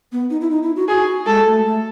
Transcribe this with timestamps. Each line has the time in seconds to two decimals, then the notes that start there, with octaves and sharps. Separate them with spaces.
0.12 B3
0.30 D#4
0.41 E4
0.51 D#4
0.63 E4
0.76 F#4
0.88 F#4 G#4
1.26 G#3 A4
1.46 A3
1.65 A3